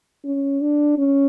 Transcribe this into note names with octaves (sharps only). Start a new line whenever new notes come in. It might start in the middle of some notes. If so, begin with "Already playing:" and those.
C#4
D4
C#4